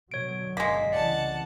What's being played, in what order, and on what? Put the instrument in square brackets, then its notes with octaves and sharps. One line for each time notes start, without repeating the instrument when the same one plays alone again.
[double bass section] B2 D3 F#3 [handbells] C#5 D7
[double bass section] G1 D3 [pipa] G#3 A#3 [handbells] B6
[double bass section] C2 C#3 E3 [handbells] D5 [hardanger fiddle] F#5 A5